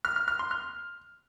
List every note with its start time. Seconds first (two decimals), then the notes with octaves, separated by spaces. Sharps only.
0.05 F6
0.16 F6
0.28 F6
0.39 C6
0.51 F6